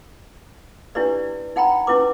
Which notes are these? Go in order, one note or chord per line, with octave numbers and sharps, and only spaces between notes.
D4 E4 G4 B4 D5
D#4 F#5 G5 A#5 B5
C#4 E4 B4 D6